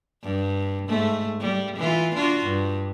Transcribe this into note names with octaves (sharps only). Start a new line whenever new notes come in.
G2
G#2 A3
G3
E3 F4
D4 F4 F#4
G2